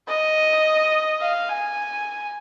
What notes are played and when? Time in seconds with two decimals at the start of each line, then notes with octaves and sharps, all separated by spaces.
0.08 D#5
1.21 F5
1.49 G#5